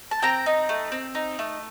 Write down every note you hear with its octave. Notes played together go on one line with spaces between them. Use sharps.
A5
C4 G5 A#5
D#4
A3
C4
D#4
A3